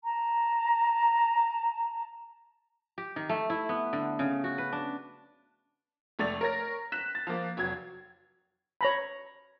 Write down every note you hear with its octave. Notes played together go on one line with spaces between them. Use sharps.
A5 A#5
G4
D#3
A3
E4
B3
D3
C#3
F#4
B4
D4
F1 A3 D5 A6 F7
A#4 C#5 A#6
F#6 B6 E7
A6
F3 A#3
F1 F#3 G#6
C#5 A#5 B5